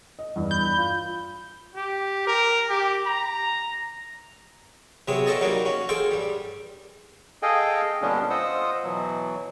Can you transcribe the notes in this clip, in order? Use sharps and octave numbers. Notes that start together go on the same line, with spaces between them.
D#5
E2 G2
B5 G6
F4
G4
A#4
G4
A#5
C3 F#3 B3 C4 G#4
D4 F4 A4 C#5 D#5 A5
F#3 G3 A#3 D4 D#4 F#4
C#4 F#4
G#4 A4 C5 F5 G5
G2 G3
G#4 A4 D#5 F5 G5 G#5
A#2 D3 G3 B3 C#4 D4
F4 C5 D#5 F#5 D#6 E6
B2 E3 F#3